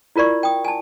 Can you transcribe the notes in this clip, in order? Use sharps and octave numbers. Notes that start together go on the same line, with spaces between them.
E4 F4 A#4 D5 C#6
G5 D#6
G#5 A5